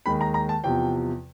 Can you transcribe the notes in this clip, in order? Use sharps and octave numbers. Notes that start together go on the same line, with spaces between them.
D#2 D#3 G#3 B5
A#5
A#5
A5
E2 C3 F3 G5